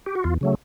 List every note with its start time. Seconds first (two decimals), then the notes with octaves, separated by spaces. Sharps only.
0.06 G4
0.15 F#4
0.24 E2 F4
0.41 C#3 F#3 A3